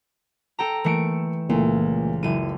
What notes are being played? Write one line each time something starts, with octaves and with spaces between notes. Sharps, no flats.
A4 G5 A#5
E3 A3 A#3 C#7 D7
C#2 A#2 E3 A3
F#1 E4 D#7